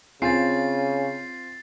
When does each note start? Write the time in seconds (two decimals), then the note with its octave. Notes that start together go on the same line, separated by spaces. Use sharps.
0.22 C#3 C4 F4 G#5 A6 C7